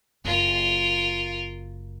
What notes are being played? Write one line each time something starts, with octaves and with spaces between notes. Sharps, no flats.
F#1 F4 A#4